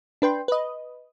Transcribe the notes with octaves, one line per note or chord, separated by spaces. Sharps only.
D4 B4 G5 C6
B4 D#5